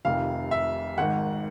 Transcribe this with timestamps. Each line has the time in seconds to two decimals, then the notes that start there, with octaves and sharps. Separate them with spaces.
0.05 F1 F2 C3 D#3 F5
0.51 E5
0.98 G#1 G#2 D#3 F#5